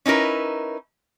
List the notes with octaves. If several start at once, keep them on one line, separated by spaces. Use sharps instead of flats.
C#4 D#4 E4 A#4 B4